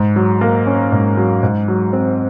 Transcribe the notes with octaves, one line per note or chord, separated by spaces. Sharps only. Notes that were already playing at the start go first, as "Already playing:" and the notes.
Already playing: G#2
F#3
A#3
C#4
G#2
F#3
G#2
F#3
C4